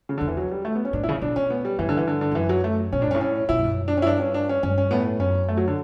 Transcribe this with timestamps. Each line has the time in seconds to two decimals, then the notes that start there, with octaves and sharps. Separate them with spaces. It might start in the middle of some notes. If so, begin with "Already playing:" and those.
0.09 C#3
0.18 D3
0.21 E2
0.28 E3
0.37 F#3
0.52 G3
0.65 A3
0.75 B3
0.85 C#4
0.93 A2 D4
1.04 E4
1.09 C#3
1.22 B2 D4
1.36 B2 C#4
1.50 B3
1.65 G3
1.79 G2 E3
1.89 D3
1.97 E3
2.08 D3
2.21 D3
2.32 G2
2.35 F#2 E3
2.49 F#3
2.64 A3
2.92 B2 C#4
3.01 A2 D4
3.07 G2
3.11 C#4
3.14 A2
3.21 C#4
3.49 B2 E4
3.59 G2
3.64 F#2
3.88 D4
3.97 C#4
4.02 E4
4.06 G2 D4
4.20 C#4
4.34 D4
4.49 C#4
4.63 G2 C#4
4.78 C#4
4.91 A2 B3
5.19 F#2 C#4
5.49 A3
5.57 F#3
5.68 D3